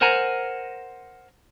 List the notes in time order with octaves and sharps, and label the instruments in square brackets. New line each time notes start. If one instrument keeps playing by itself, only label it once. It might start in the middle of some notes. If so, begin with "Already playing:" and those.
[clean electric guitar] A#4 C5 F#5 G#5 A#5